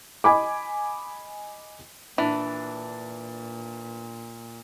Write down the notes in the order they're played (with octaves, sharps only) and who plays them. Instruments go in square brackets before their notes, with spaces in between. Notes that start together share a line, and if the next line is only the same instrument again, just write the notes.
[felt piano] D#5 G#5 B5 D6
[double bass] A#2 [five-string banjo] E3 [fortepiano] D4